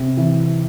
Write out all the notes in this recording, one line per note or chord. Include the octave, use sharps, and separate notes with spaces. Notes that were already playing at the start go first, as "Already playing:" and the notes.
Already playing: C3
E3